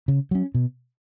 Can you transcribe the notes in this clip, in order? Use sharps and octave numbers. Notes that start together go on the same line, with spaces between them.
C#3
F#3 C#4
B2